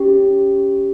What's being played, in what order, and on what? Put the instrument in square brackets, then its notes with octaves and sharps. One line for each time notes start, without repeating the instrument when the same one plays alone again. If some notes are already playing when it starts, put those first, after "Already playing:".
Already playing: [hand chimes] C#4 G4